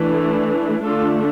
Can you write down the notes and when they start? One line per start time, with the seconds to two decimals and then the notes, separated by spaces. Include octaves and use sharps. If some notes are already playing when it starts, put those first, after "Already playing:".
Already playing: E3 A3 D4
0.84 D3 A3 D4 F4 A4